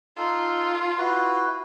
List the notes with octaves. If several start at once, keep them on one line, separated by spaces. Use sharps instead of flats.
D#4 F4 A4
E4 F#4 B4